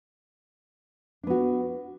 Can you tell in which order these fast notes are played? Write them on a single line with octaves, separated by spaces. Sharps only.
D4 B3 F#4